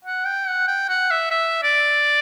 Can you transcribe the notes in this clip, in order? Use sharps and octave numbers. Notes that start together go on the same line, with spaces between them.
F#5
G5
F#5
G5
F#5
E5
E5
D5